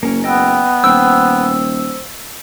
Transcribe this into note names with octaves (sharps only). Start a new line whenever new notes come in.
F#1 A#3 C#4
B3 D#5 G5 E6
D#1 C5 G5 E6